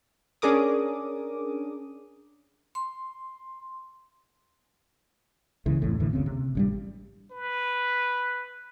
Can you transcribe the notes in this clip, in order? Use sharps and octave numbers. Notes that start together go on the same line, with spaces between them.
C#4 D4 G#4 A#4 D6 D#6
C6
C#2 C#3 E3
G#1 E2 A2
D#2 A2 D3 E3
F#1 D2 C#3 C4
C3
A1 G2 G3
B4